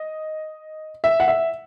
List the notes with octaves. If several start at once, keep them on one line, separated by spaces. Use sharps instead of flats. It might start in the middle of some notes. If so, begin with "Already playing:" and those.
Already playing: D#5
E5
F#5
E5